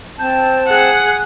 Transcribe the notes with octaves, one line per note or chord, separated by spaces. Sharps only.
C4 A5 G6
G#4 F#5 F#6